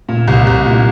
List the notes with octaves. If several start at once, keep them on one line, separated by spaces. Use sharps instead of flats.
A#2
C2
C2
A#2